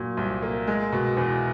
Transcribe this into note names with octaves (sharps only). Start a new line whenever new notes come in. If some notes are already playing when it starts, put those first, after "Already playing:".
Already playing: A#2 F#3
C2
A#3
G#3
B2
E2